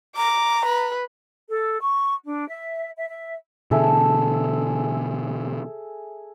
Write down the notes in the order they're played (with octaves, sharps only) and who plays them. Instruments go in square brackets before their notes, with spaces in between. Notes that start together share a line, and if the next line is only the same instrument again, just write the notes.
[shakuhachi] A#5 [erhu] D6
[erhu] B4
[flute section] A4
C#6
D4
E5
E5
E5
[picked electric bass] B2 D3 E3 [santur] G#4 A4 E5